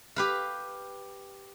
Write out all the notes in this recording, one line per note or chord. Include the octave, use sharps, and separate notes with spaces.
G4 B4 F5